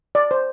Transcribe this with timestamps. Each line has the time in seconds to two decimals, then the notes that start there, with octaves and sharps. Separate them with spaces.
0.15 D5
0.31 C5